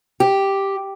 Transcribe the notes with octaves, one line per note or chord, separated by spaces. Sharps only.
G4